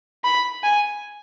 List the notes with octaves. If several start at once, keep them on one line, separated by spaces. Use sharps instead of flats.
B5
G#5